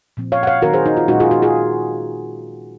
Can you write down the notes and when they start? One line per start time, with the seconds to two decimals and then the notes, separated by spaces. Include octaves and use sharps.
0.17 A#2 F3 C4
0.32 C#5 F5
0.43 F#5
0.47 C#5 F5
0.62 D#3 F#3 C4 D#4 F#4 A#4
0.73 G#4 C5
0.86 D#4
0.97 F4
1.08 A#2 G#3 C#4 D#4 F#4
1.20 F4 G#4
1.31 D#4 F#4
1.42 F4 G#4